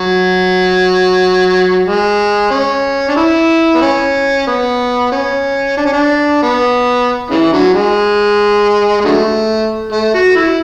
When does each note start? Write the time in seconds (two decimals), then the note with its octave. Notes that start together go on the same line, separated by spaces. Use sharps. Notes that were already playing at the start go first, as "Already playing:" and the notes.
Already playing: F#3
1.85 G#3
2.50 C#4
3.09 D4
3.16 E4
3.75 B3
3.81 C#4
4.47 B3
5.12 C#4
5.77 D4
5.85 C#4
5.93 D4
6.43 B3
7.30 C#3 E3
7.53 D3 F#3
7.74 G#3
9.00 G#3
9.04 D3 F#3 A3
9.92 A3
10.14 F#4
10.36 E4